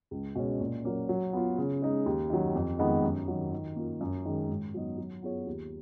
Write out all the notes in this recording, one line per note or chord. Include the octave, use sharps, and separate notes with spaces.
C#2
B2 G#3 C#4
A#2
F#3 A#3 C#4
F#3
B3 F4
C#3
G#3 D#4
D#2
D#3 F#3
F2
D#3 G#3 B3 D#4
F#2
D#3 F#3
D#3
A#3 F4
F#2
D#3 G#3
G#2
F#3 B3 D#4
F#3
B3 F4 G#4 C#5
D#2